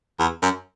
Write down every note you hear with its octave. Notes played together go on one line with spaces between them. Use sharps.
E2
F#2